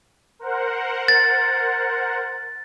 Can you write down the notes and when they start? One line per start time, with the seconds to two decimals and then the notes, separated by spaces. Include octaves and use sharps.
0.39 A#4 C5 F#5
1.08 A6